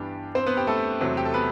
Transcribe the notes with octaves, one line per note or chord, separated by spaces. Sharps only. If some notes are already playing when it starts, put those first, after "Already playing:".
Already playing: G2 E3 B3 D4 G4
C4 C5
B3 B4
G4
A3 A4
E2 C3 F#3 C4
G4
A4
B3 B4